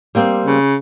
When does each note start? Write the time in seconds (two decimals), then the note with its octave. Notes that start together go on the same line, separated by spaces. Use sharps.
0.15 G3 A#3 C4
0.46 C#3